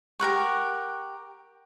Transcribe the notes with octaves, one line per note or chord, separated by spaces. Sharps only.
G4 A#4 F#5 C#6